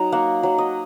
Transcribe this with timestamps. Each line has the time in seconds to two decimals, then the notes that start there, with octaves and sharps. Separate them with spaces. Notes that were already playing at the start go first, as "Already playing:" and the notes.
Already playing: F#3 D#4 A#5
0.12 A#3 F#5
0.43 F#3
0.58 D#5